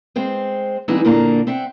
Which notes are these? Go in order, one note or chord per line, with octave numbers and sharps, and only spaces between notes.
G#3 C4 C5
E3 G3 G#3 B3 C4 D#4
A#2 D3 A#3 D4 A#5
C4 E5 F#5 G5